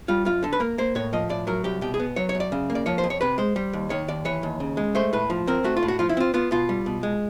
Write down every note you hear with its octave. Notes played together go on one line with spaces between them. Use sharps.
G3 F4
F#2 F4
D3 A4
B4
A#3 A#4
A#3 C5
A2 C#5
F3 D#5
A2 D5
F#3 A#4
C2 G4
B2 G4
G#4
B3
F#3 C#5
C#5
F#2
D5
C#3
A#3
D5
F3 C#5
C5
F2
C#5
C3 B4
G#3 C5
G3
D#2
D#3 C#5
D#2 D5
E3 C#5
D#2
C#3
G#3
A3 C5
A2 B4
F3
C4 A#4
A3 F#4
F4
A2
F#4
F3 F4
E4
C4 F4
B3 F4
B2 F4
G3
B2
G#3